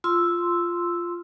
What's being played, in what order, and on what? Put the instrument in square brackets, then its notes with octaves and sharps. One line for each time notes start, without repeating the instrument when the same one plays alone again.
[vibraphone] F4 C6 E6